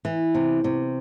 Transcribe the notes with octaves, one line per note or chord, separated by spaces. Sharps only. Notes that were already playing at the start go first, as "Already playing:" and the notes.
E3
C3
C3